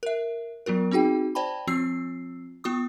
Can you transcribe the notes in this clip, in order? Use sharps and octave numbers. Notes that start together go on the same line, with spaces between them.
A#4 E5
F#3 B3 F4 A#4
C4 D#4 F#4 G#4 G5
C5 D5 G5 A5 B5
F3 C4 F4 E6 C7
B3 F4 C#6 D#6